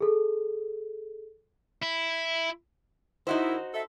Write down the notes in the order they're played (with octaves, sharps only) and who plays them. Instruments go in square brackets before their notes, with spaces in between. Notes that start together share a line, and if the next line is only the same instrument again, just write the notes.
[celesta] G#4 A4
[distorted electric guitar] E4
[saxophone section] D#3 E4 [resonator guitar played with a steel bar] D#4 F#4 C5
[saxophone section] A4 E5